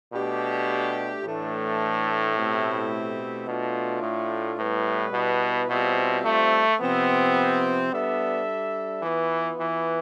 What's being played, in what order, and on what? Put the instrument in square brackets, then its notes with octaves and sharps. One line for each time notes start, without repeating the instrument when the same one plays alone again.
[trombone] B2 [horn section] A3 D4 G4
[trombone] A2 [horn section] E3 A3 D4
[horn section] B2 A3 C4 E4 G4
[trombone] B2 [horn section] A3 D4 F4
[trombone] A2
[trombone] A2 [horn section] G3 B3 E4 B4
[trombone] B2
[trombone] B2 [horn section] G3 C4 F4 C5 E5
[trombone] A3
[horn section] C3 F3 C4 [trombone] B3
[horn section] G3 D4 A4 E5 [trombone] B3
[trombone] E3 [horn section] B3 F4 B4
[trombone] E3